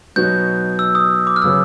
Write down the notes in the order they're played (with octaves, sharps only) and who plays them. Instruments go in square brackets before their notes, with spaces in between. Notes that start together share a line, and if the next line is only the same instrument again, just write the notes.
[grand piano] B2 F#3 B3 D#4 F#4 [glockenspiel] G6
[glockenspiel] E6
D#6
D6
F6
[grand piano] C#3 F#3 B3 [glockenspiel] E6